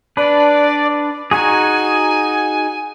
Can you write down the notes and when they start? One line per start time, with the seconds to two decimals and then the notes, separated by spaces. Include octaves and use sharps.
0.17 D4 B4 D5
1.31 D#4 F#4 G#4 G#5